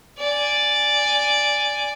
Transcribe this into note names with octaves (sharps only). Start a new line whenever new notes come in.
D5 G#5